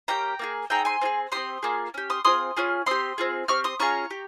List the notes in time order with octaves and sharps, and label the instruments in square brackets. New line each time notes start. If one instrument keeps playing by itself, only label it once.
[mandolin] A#3 C#4 G4 G5 A#5
A#3 F4 G#4
C4 D#4 G#4 G5 A#5
G#5 C6
C4 F4
G#4
C4 D#4 G4 C6 D#6
A#3 F4 G#4
C#4 G4
C6 D#6
C4 F4 G#4 C6 D#6
C#4 F4 G#4
C4 G4 C6 D#6
C4 F4 G#4
C4 G4 C#6 F6
C6 D#6
C#4 F4 G#4 A#5 C#6
G4